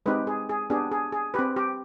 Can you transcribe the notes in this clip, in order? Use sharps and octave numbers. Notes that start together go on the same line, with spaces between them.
G#3 C4 D#4 G4 B4
G#4
G#4
B3 D4 G4 G#4
G#4
G#4
C4 G4 B4
G4